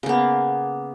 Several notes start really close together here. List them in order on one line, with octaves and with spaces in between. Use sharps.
C#3 A#3 B3